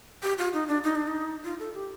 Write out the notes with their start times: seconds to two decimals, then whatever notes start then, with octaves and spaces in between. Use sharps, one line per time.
0.23 G4
0.38 F4
0.53 D#4
0.68 D4
0.84 D#4
0.95 D4
1.08 D#4
1.44 F4
1.59 A4
1.74 G4